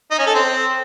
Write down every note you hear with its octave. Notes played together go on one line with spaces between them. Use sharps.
D#4
C#4
A4
C4